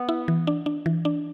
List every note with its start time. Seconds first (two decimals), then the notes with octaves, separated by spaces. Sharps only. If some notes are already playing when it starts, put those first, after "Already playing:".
Already playing: B3
0.09 E4
0.28 E3
0.47 D4
0.66 D4
0.86 E3
1.05 D4